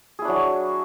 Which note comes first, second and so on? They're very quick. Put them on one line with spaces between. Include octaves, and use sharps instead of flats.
G#4 E4 D4 F#3